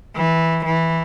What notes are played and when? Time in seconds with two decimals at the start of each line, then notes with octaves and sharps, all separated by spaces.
0.16 E3
0.65 E3